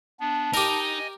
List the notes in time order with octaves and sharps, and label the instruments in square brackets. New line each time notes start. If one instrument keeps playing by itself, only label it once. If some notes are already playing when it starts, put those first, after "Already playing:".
[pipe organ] B3 D4 [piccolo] A5
[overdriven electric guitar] D#4 [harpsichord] G4 A#4 [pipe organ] D#5 G#5